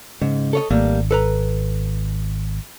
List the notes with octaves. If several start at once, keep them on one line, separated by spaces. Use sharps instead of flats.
G#2 C#3
A4 C#5 D#5
G#1 G3 A3 A#3
A4 B4 A#5